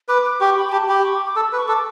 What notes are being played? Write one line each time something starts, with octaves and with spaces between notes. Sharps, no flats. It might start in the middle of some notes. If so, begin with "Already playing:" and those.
B4 D6
D6
G4 C#6
B5
G5
G4 A5
G4 B5
C#6
D6
D6
A4 E6
B4
C#6
A4 D6